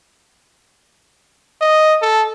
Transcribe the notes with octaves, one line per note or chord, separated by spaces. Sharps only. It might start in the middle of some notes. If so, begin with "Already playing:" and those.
D#5
A4